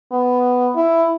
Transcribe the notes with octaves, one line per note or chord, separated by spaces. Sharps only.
B3
E4